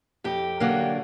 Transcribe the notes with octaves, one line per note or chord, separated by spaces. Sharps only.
F2 G4
D3 F#3 A#3 D4